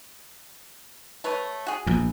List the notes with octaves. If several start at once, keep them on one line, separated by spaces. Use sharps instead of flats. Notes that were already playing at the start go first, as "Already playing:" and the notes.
A3 B4 C#5
F#4 G#4
A#1 E2